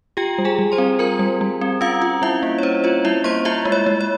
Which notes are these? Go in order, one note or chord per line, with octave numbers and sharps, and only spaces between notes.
F4 G4 G5
G3
G#4 G#5
G3
C5 C6
C4
F4 A#4 A#5
G3
G3
C4
C#4 F4 F5
F4
G3 E4 E5
A#3
C#5
C#4 C5
F4 C#5
G3 E4 E5
A#3 C5 C6
E4 F4 E5
G#3
C#5
G#3
C#5